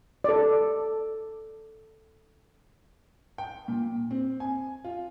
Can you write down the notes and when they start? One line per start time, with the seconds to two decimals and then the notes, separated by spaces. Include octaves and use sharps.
0.24 A4 D5
3.38 G5
3.68 A#2
4.11 C4
4.40 G#5
4.84 F4